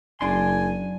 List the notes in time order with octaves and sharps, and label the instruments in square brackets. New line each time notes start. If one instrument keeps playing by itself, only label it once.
[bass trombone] F#1 [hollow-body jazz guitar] F#2 D4 C6 [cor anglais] G#5